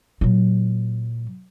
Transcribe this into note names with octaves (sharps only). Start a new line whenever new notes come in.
A#2 F#3